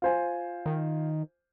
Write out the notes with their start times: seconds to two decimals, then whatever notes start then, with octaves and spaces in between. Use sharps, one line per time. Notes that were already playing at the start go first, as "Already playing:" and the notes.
0.02 F4 C5 G#5
0.66 D#3